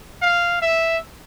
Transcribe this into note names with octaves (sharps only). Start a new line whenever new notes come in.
F5
E5